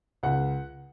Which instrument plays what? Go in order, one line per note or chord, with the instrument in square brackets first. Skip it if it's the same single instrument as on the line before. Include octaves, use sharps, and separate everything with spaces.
[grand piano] C#2 F#5